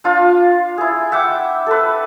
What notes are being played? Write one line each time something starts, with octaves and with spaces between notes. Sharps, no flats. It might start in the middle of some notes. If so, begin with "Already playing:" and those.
D4 F4 F5
E4 G#4
E5 F#5 G5 D6
A4 B4